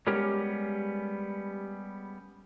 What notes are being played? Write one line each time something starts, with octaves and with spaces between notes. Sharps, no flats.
G3 G#3 B3 C#4 G4 A#4